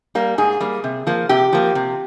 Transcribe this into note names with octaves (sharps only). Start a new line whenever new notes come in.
G3 A#3
G#2 G#4
G3 A#3
C3
F3 A#3
C3 G4
F3 A#3
C3